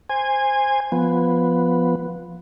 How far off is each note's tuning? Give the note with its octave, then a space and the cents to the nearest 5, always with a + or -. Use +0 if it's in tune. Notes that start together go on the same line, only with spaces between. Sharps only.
C5 +0 G#5 -20
F3 +0 B3 +0